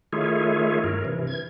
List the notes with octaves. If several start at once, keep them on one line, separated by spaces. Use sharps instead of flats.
D#3 A3 E4 F4 G#4 C#5
G2 A#4
C3 E3
G#6